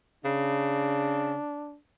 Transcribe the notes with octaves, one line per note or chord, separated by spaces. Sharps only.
C#3 D4